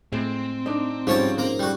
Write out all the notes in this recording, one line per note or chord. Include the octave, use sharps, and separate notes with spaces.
A2 G#3 C4
D4 D#4
G#2 C#3 F3 G3 C#5 A5
A#3 A#5
G3 F#4